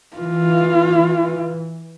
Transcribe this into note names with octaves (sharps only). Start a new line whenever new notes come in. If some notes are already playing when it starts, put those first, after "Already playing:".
E3 F4